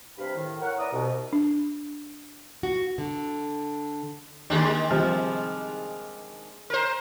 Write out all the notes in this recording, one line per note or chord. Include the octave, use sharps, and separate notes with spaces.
G2 C3 F5 B5
A2 D#3
A#4 C#5 F#5
B3 E4 D5 F#5 A#5 D#6
C2 B2
D4
F#4
D3
D#2 D#3 G#3 D4
C3 F3 G3
A#4 C5